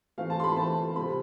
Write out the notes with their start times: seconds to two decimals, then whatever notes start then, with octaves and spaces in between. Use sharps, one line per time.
0.18 E3 A3 C4 F5
0.30 A5
0.40 C6
0.43 B5
0.57 E3 A3 C4 A5
0.96 C3 G3 C4 B5